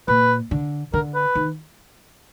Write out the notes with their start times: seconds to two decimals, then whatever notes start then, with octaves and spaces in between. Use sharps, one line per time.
0.08 A#2 B4
0.51 D3
0.93 D3 A#4
1.15 B4
1.35 D#3